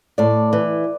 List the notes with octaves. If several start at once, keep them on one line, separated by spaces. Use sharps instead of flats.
A2 D5
E3